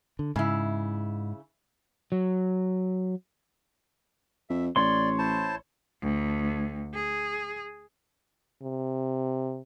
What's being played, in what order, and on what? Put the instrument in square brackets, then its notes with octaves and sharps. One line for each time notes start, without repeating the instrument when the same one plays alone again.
[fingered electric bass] D3
[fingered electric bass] G#2 [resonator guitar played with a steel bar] C#3 E4
[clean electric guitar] F#3
[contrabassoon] F2 [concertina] E5
[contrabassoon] A1 [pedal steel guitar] C#5 C6 [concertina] D5
[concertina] E4 C5 A5
[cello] D2
G#4
[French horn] C3